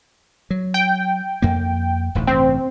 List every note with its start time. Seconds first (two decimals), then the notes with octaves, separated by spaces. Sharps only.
0.51 F#3
0.74 G5
1.42 F2 A#3
2.15 D1 A1 G#2
2.27 A1 G2 C3 C4